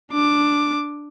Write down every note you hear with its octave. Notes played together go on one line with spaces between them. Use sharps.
D4 D6